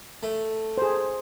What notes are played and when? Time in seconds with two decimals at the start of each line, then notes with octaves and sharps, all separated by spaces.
0.23 A3
0.78 G#4 C5